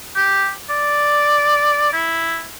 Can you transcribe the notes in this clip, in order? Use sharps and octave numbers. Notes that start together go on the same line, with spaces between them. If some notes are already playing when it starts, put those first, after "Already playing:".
G4
D5
E4